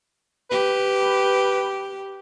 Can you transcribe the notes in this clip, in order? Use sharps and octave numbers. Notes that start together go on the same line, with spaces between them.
G4 B4